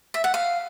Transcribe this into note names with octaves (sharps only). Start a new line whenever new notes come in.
E5
F#5
F5